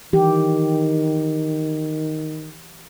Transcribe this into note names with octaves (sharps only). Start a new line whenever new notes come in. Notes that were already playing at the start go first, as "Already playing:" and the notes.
D#3 E3 G4